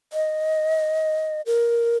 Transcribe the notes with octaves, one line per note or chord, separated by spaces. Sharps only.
D#5
A#4